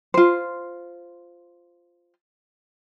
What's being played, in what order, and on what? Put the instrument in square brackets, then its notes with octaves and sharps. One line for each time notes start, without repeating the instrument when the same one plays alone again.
[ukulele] F4 C5